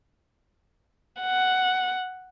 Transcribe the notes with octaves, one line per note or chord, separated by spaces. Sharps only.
F#5